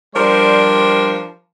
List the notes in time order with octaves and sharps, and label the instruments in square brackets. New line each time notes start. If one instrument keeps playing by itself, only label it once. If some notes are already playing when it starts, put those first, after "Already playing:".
[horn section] F3 G3 D4 A#4 C5